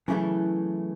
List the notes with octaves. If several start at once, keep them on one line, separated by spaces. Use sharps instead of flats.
C#3 E3 F#3 A3 E4 A4